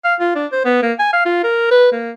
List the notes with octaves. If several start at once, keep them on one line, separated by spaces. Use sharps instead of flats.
F5
F4
D4
C5
B3
A#3
G#5
F5
F4
A#4
B4
A#3